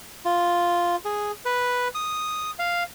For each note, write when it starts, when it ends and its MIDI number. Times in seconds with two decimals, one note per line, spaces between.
0.25 0.96 65
1.05 1.31 68
1.45 1.88 71
1.95 2.51 87
2.59 2.83 77